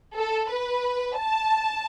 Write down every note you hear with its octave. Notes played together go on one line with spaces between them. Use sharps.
A4
B4
A5